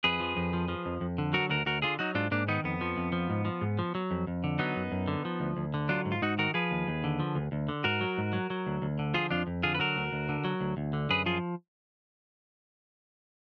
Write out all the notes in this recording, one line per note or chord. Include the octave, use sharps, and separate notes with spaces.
F2 G#4 B4
F3
F2
F3
F3
F2
F2
D3
F#3 F#4 A#4
D2 F#4 A#4
D2 F#4 A#4
D3 F4 G#4
F#3 D#4 F#4
G#2 D4 F4
G#2 A#3 D4
D#3 B3 D#4
F2 B3
F3
F2
F3
G#2
F3
G#2
F3
F#3
F2
F2
D3
F#3 B3 D#4
F#2
F#2
D3
F3
D2
D2
D3
F#3 D4 F4
G#2
F4
G#2 D#4 F#4
D#3 F#4 A#4
F3 G#4 B4
D#2
D#2
D3
F3
D2
D2
D3
G#2 F#4 A#4
F#3
G#2
F#3
F#3
D2
D2
D3
F3 F4 G#4
F2 D4 F4
F2
D3 F4 G#4
B4
F#3 F#4 A#4
D2
D2
D3
F#3
D2
D2
D3
F#2 G#4 B4
F3 F4 G#4